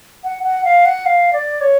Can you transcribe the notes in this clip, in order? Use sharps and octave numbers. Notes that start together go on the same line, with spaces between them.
F#5
F#5
F5
F#5
F5
D5
C#5